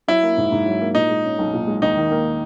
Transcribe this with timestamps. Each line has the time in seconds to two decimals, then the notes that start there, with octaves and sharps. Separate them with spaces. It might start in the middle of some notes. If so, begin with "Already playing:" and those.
0.08 F#3 E4
0.23 A#3
0.37 G#2
0.52 G#2
0.66 F#3
0.81 A#3
0.95 A#2 D#4
1.09 G#3
1.24 C#4
1.38 B1
1.53 A#2
1.67 G#3
1.82 D#2 D#4
1.97 D#3
2.11 A#3